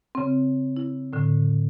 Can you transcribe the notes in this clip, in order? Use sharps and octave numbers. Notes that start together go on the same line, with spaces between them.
C#3 C4
E4
A2 D3